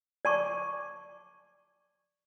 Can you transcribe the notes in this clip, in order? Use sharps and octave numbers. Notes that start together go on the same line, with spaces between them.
D5 A5 C#6 D6